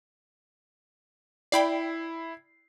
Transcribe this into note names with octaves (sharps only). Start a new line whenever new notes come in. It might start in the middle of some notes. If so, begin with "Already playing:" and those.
E4 D5 G5 B5 C7